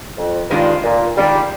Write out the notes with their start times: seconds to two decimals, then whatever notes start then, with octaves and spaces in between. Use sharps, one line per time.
0.18 F2
0.50 G2 D#3 G#3 D4 F4
0.84 A#2
1.17 D#3 G3 G#3 D4 F4